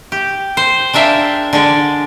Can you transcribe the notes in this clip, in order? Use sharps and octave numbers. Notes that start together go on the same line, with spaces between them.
G4
C5
G#3 D4 A#4 E5 F5 G5
D3 G#3 D5